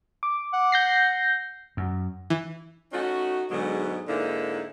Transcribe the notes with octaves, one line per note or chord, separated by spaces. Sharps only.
D6
F#5
G6 A#6 C7
F#2
E3
A3 C#4 D#4 F#4
G#2 B2 D3 F#3 G#3
G#2 D3 A#3 D#4 E4